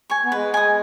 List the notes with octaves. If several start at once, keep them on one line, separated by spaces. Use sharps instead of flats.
G#5 C#6
B3
G#3 B4
G#5 D#6